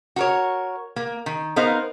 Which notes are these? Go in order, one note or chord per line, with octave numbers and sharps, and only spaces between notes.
F#4 A#4 C#5
A#3
D#3
B3 D#4 A#4 C5 F5